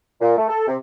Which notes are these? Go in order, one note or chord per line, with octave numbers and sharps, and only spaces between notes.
A#2
A3
A4
C3